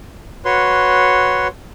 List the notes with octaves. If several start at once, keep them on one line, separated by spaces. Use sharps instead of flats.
F#4 B4 C#5 C6